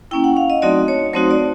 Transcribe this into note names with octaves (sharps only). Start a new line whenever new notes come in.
A#3 C#4 E4 G5
F#5
F5
D#5
F#3 A3 C4 D#4 F#4 D5
C#5
F#3 A3 C4 D#4 F#4 C5
D5